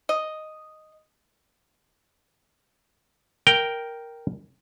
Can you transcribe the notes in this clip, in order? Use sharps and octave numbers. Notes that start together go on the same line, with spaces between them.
D#5
A#4 G5